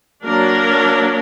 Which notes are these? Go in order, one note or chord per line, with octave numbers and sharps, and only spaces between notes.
F#3 A#3 D4 A#4